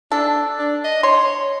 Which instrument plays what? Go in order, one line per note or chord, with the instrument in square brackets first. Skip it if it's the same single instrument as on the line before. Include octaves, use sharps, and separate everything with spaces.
[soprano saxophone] D4 [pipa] A4
[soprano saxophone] D4
D#5
[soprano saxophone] C#5 [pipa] C6